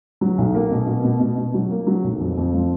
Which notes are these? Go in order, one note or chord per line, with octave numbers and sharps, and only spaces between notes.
F#3
B1
A#3
B2
B2
B2
B2
B2
F#3
A#3
F#3
B1
F2
F2
F3